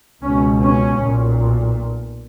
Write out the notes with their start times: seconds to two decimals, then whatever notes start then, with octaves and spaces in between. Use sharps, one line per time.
0.22 C#2 B2 C#4
0.62 C#4
1.01 B1 A#2